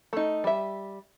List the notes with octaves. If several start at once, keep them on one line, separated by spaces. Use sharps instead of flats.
A3 D#4
G3 E5